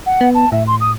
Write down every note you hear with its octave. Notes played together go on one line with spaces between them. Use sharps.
F#5
B3
A5
A2 E5
C6
D#6